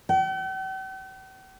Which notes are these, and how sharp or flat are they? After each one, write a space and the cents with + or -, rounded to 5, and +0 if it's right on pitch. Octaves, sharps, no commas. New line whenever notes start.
G5 -45